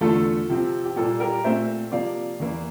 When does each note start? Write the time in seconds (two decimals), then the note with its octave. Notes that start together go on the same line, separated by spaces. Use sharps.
0.01 E2 D3 A3 F4 A4
0.49 C3 F3 C4
0.85 G4
0.96 A#2 G3 A#3 F4 A4
1.20 G4 A#4
1.44 A#2 A3 C4 C5 E5
1.92 C3 F3 A#3 D5 F5
2.40 E2 E3 A#3